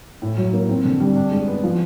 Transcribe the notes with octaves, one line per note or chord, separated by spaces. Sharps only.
A2
F#3
A#3
C4
D3
G3
D4
G#3
B3
F3